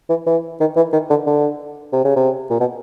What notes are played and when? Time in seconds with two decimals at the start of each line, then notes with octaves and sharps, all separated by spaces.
0.10 E3
0.26 E3
0.60 D#3
0.76 E3
0.93 D#3
1.10 D3
1.26 D3
1.92 C3
2.05 C#3
2.16 C3
2.50 A#2
2.60 B2